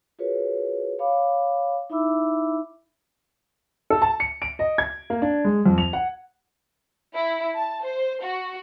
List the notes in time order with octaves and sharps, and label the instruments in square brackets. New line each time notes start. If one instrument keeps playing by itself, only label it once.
[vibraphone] F4 F#4 G#4 A#4 B4 C#5
C#5 F5 B5 D6
D#4 E4 E5 B5 D6 E6
[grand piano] A4
A5
C#7
D7
D#5
G#6
A#3
D4
G#3
F2
F7
F#5
[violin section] E4
A5
C5
F#4